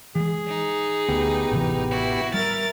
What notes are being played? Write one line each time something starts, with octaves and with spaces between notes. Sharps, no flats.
E3 G#3 G#4
D#4
D2 B3 G4
A1 C3 E3
E4 F#4
G3 A#4 E5 F6 A6